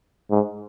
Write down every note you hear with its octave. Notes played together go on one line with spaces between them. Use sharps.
G#2